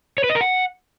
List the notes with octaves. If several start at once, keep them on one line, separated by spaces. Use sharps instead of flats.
C#5
B4
D#5
A#4
F#5